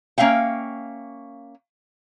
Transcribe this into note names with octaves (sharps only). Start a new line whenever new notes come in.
A#3 C#4 E5 F5 G5